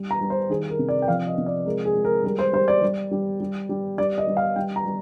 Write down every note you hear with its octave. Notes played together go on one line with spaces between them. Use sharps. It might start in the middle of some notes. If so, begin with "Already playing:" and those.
Already playing: G3
A#5
G3
C5
D#3 G#4
A#4
C3
D5
G5
F3 F5
D#5
C3
D5
G#3 A#4
G#4
G#3
A#4
G3 A#4
C5
G3 C5
D5
G3
G3
G3
G3
G3 D5
D#5
G3
F5
G3 G5
A#5
G3